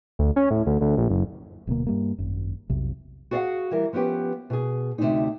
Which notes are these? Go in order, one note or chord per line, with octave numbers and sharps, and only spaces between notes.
D2
C#4
A2
D2
D2
A#1
F#1
D1 B2 D3 A#3
G2 G3 A#3
G#1 F#2
B1 F2 C3
F#4 G#4 D5 D#5 F5 F#5
E3 G3 A#4
F3 B3 C#4 G4 B4
B2 G#4
D2 C3 F3 A3 C4 D#4